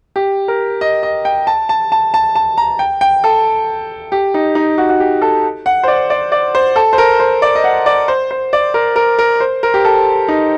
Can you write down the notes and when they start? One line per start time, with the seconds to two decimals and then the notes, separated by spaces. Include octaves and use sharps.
0.16 G4
0.48 A#4
0.81 D#5
1.03 D#5
1.25 G5
1.47 A5
1.69 A5
1.92 A5
2.14 A5
2.35 A5
2.58 A#5
2.79 G5
3.01 G5
3.24 A4
4.12 G4
4.34 D#4
4.55 D#4
4.78 F#4
4.89 F#4
5.00 G4
5.22 A4
5.66 F#5
5.83 C5
5.88 D5
6.10 D5
6.32 D5
6.55 C5
6.76 A4
6.93 C5
6.98 A#4
7.20 C5
7.42 D5
7.55 D#5
7.64 F#5
7.86 D5
8.08 C5
8.31 C5
8.53 D5
8.74 A#4
8.96 A#4
9.19 A#4
9.40 C5
9.63 A#4
9.74 G4
9.85 A4
10.28 D#4